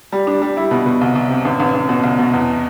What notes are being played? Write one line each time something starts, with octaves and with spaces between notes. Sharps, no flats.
G3
D4
G3
E4
B2
B2
C2
C2
C3
A1
A1
A1
B2
C2
B2
E2